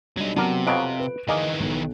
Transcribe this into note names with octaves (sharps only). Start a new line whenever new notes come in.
F#3 G3 D4 D#4
C3 F#3 B3 D4 A#4
F2 B2 F#3 F5 F#6 D7
B4
D#3 E3 A#3 G#4 D#5
B1